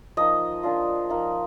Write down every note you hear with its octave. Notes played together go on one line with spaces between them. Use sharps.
F3 A#3 D#4 D#5
A#3 D4 F4
F3 A#3 D#4